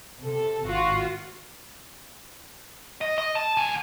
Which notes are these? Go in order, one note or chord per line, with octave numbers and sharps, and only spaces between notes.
C3 A4
G#1 F4 F#4
D#5
D#5
A5
D2 G#5